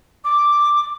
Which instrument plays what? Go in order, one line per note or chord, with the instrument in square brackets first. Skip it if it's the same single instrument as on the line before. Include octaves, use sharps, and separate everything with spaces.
[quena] D6